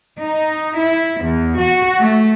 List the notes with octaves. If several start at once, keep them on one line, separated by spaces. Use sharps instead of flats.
D#4
E4
E2
F#4
A3